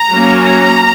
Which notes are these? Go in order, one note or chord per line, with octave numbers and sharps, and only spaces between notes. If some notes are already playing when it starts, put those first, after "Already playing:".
Already playing: A#5
F#3 A#3 C#4
A#5